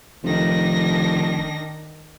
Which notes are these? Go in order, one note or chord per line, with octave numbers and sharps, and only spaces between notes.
F1 D#3 D4 A#6